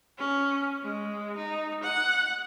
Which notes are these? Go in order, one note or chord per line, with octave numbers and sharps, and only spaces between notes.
C#4
G#3
D#4
F#5